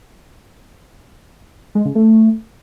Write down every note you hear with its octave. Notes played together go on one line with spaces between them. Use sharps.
G#3
C#3
A3